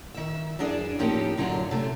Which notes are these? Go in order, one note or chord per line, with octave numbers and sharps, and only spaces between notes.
D#3 E5
F#2 E3 D4 G#4 D5
A2 F3 A#3 C#4 D#4 G4
F#2 D3 F#3 D4 F4
C3 A3